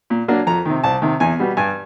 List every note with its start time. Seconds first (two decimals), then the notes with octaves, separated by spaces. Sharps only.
0.10 A#2
0.28 F#3 A#3 D4
0.47 F2 A#5
0.65 C3 D#3
0.84 C2 A5
1.02 C3 D#3
1.20 E2 G#5
1.39 B2 G3 B3
1.57 G2 G#5